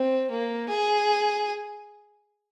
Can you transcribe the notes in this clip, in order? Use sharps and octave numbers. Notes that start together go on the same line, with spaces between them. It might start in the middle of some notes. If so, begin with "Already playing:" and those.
Already playing: C4
A#3
G#4